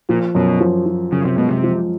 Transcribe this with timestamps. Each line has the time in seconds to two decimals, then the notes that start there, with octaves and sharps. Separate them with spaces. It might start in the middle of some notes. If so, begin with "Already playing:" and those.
0.09 A#2 F3
0.35 F#2 B2
0.61 F3
0.86 F3
1.12 F#2 C#3
1.25 C3
1.37 B2 G#3
1.51 C3
1.63 F3